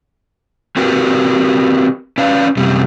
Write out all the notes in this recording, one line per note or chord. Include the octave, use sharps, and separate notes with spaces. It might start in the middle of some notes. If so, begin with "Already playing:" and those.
C4 F#4 G4 A#4 B4
C#4 B4 D5 F5
F#2 C3 G3